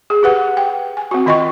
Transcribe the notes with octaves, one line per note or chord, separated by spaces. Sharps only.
G#4
G4 B4 F#5
G5
G#5
C4 F#4
D#3 F4 D#5 G5 C#6